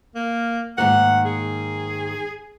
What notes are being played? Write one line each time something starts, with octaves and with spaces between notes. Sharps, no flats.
A#3
G#2 D#3 A#3 F#5
G#4